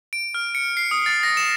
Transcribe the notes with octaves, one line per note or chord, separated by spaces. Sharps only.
D7
F6
C#7
C7
D#6
A6
A#6
E7